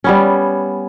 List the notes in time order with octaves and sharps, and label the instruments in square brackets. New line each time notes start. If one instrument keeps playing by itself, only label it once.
[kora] G3 B3 C#4